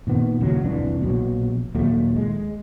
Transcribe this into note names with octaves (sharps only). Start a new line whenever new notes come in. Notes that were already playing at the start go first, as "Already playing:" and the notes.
A#2 D#3 B3
D#2 A2 C#3 F#3
C2 F2 E3 D4
A#1 B2 E3 F#3
D#2 A#2 F#3 A3
G#3